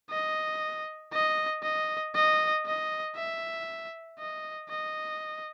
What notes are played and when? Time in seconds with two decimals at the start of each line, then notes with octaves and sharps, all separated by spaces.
0.11 D#5
1.13 D#5
1.63 D#5
2.15 D#5
2.66 D#5
3.16 E5
4.19 D#5
4.69 D#5